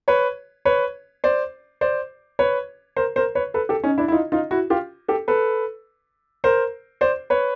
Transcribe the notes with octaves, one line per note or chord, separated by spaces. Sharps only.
B4 C#5
B4 C#5
C5 D5
C5 D5
B4 C#5
A#4 C5
A#4 C5
B4 C#5
A4 B4
G4 A4
C#4 D#4
D4 E4
E4
D#4 F4
D#4 F4
E4 F#4
F4 G4
G4 A4
A4 B4
A#4 C5
C5 D5
B4 C#5